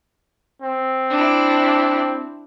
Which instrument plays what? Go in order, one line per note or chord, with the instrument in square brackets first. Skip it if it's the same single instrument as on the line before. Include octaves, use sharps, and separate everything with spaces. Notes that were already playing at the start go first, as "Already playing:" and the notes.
[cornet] C4
[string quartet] D4 E4